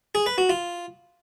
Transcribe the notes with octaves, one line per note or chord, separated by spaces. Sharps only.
G#4
B4
F#4
F4